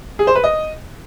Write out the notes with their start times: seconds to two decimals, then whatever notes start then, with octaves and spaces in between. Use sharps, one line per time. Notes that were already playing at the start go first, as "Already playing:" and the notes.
0.19 G#4
0.27 C5
0.35 B4
0.44 D#5